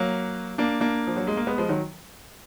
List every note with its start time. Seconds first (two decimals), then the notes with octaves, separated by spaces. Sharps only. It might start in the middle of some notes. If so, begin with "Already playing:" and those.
Already playing: F#3 A#3
0.58 A#3 D4
0.80 A#3 D4
1.07 F3
1.17 F#3
1.27 G#3
1.37 A#3
1.47 G#3 B3
1.58 F3 G#3
1.69 D#3 F#3